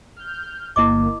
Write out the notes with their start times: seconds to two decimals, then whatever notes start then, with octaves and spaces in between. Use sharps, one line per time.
0.17 F6 G6
0.76 G1 A#3 E4 D#5 D6